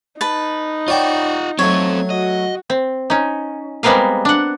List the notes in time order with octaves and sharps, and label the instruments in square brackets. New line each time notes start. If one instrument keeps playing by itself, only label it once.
[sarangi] D#4 [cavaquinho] B4 A5
[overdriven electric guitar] F4 F#5 [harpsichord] C#5 D5 G5
[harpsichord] F#3 A3 [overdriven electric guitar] C4 A4 [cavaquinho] C#5
[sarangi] F#4 [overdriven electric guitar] D#5
[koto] C4
C#4 D#4
G3 G#3 B3 C4 A#4 F5
D4 F#5